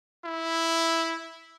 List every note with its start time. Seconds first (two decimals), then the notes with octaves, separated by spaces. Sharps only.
0.24 E4